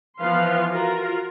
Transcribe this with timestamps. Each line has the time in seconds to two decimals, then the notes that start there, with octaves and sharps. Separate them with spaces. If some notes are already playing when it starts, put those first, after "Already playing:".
0.18 E3 F3 B3 B4 F5 C6
0.68 F4 F#4 A#4